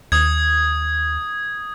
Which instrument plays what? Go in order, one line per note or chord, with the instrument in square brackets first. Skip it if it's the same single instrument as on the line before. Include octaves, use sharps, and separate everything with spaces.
[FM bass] D#2 [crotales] D#6 G#6